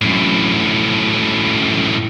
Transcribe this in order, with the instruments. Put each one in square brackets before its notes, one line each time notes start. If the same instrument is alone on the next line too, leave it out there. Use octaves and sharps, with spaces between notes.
[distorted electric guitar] F#2 A2